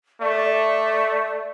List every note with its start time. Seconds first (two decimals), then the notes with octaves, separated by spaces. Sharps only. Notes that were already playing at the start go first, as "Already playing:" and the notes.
0.22 A3 D5